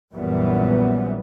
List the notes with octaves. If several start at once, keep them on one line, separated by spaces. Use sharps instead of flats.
A#1 F#2 A#2 E3 G3 B3